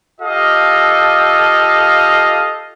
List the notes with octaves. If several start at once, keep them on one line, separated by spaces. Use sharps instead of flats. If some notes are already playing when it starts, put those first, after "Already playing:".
F4 G4 A4 D#5 F5